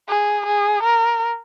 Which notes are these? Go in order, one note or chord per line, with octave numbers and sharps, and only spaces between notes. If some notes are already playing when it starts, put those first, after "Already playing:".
G#4
G#4
A#4